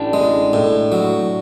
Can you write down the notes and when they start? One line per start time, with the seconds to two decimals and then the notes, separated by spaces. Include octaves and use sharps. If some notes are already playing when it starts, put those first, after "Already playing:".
Already playing: A1 D4
0.13 G#3
0.53 A2
0.92 F#3